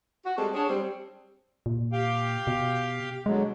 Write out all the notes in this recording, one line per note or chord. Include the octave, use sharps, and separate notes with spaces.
F#4
G3 G#3 C4 A4
D4 G#4 C#5
G3 C4
A#2
G4 F5 G5
B2
B2 D3 F#3 G#3